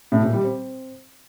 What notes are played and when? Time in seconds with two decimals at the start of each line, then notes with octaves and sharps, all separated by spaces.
0.12 A2
0.22 A#2
0.33 G3
0.43 C4